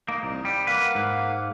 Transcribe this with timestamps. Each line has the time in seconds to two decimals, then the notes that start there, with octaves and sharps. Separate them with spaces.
0.08 A#3 D#4
0.23 C2
0.45 G3
0.67 A#3 B4 F5 F#5
0.95 G#2